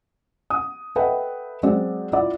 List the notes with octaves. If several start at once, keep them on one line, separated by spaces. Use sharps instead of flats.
D#6
A4 B4 D#5 E5 F#5 G5
F#3 G#3 C4 F#4 D5
E4 F4 D5